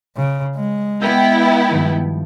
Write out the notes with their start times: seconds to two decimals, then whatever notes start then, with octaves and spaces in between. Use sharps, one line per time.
0.17 C#3
0.56 G#3
1.01 B3 E4 G5 E6 G6
1.70 G2 D#3 F3